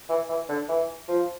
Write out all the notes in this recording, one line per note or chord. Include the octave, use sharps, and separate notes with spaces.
E3
E3
D3
E3
F3